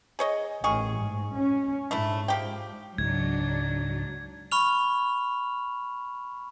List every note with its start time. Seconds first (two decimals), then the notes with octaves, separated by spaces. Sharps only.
0.19 G#4 C#5 D#5
0.64 A1 D#3 G#4 C#6
0.97 G#2
1.34 C#4
1.91 G#2 A3 D4 E4
2.28 F3 G4 G5
2.98 C#2 G#2 F#3 D4 G#6
4.52 B5 C#6 F6 F7